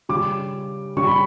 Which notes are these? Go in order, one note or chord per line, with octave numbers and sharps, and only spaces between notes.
C#3 G3 C#4 D6
C#3 G3 C#4 C#6
B5